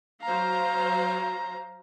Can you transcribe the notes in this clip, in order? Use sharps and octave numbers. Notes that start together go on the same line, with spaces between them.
F#3 C5 F5 A#5